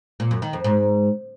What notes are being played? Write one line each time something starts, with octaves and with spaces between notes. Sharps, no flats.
A#2
F#2
D#3
F2
G#2